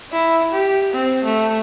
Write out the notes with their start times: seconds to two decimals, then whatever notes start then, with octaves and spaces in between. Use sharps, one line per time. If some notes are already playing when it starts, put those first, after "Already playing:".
0.12 E4
0.53 G4
0.93 C4
1.25 A3